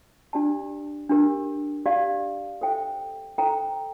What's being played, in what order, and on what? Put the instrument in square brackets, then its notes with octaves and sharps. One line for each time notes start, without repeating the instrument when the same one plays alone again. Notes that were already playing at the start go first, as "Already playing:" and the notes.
[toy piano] D4 G4 D5 A5
D4 G4 A#4
G4 D5 F5
A4 C5 E5 G5
A4 C5 G5 A#5